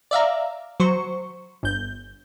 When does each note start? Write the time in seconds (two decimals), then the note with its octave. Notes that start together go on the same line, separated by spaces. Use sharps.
0.11 D5 E5 F5 A#5
0.80 F#3 C5 C#6
1.63 G1 G6